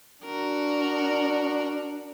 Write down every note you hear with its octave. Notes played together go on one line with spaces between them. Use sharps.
D4 F#4 A#4